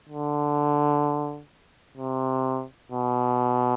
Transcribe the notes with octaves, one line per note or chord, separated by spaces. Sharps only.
D3
C3
B2